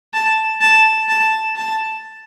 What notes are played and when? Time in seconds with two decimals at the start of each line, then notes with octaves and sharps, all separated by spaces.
0.14 A5
0.61 A5
1.08 A5
1.56 A5